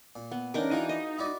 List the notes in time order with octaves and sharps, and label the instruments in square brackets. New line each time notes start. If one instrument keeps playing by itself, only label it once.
[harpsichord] A#2
[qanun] B3
[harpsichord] C#3 E3 [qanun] D4 D#4 A#4
[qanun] E3 [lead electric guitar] D#4 [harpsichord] F4 F#4 G#4
[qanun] D#5
[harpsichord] E4 F#4 D5